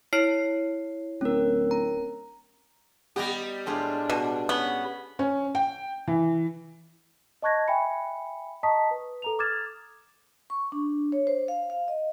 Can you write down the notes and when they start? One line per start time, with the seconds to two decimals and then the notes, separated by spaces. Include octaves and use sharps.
0.13 E4 C#5 C7
1.21 D1 C#4 A#4
1.71 A#5
3.16 G3 B3 G4 D#5 A#5
3.66 A2 G#3 D4 F4
4.10 B2
4.49 B3 C#4
5.19 C#4
5.55 G5
6.07 E3
7.42 D#5 A5 C#6 F#6 G#6 A#6
7.68 E5 G5 G#5 B5 C#7
8.63 D#5 A5 A#5 C#6 D#6 B6
8.91 B4
9.22 A4 A#5 F7
9.39 D6 D#6 F6 G#6 A6 E7
10.50 C#6
10.72 D4
11.12 C#5
11.27 C5
11.48 F5
11.70 F5
11.88 D#5